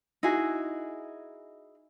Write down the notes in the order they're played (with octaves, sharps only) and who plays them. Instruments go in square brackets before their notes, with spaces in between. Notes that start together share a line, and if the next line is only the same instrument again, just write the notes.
[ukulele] D#4 E4 F#4 G#4